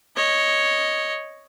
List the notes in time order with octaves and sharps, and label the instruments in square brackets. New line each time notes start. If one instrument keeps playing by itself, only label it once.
[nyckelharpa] C#5 D#5